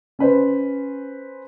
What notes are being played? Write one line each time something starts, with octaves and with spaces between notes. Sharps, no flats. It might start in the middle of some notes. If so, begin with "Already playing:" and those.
C#4 B4 C5